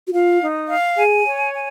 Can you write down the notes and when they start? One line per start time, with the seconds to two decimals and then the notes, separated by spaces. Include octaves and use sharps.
0.07 F#4
0.13 F4 F5
0.41 D#4
0.68 F5
0.97 G#4 G#5
1.25 C#5
1.53 G#5